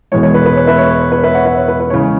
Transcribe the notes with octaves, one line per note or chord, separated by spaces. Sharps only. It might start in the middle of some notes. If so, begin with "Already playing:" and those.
E1 E2 E3 G#3 C#5
C#5
B4
B4
C#5
B4 E5
C#5
C#5
C#5
B4
B4 E5
C#5 F#5
B4 E5
C#5
B4
B4
C#3 E3 G#3 C#5